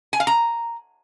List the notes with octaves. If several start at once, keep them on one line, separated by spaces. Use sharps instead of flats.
G#5
F5
A#5